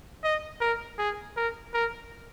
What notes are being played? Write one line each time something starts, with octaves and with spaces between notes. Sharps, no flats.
D#5
A#4
G#4
A#4
A#4